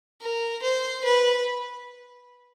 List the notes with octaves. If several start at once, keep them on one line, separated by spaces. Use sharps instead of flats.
A#4
C5
B4